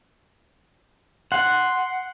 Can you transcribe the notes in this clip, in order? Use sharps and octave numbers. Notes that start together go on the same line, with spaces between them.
F#5 C6